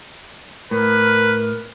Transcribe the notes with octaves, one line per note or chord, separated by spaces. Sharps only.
A2 A#4 B4